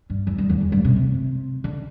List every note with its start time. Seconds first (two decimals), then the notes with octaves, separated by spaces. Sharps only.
0.10 G2
0.27 E2
0.38 G2
0.50 E2
0.61 E2
0.72 G2
0.85 C3
0.96 C3
1.64 D3